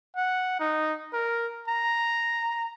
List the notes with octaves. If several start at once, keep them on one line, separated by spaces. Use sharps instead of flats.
F#5
D#4
A#4
A#5